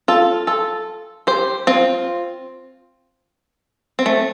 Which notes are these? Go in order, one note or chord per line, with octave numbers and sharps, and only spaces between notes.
F4 A4
F4 A4
G4 C5
C4 F4
C4
A3